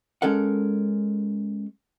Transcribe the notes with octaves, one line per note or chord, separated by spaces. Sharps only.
G#3 C#4 A4 A#4 F#5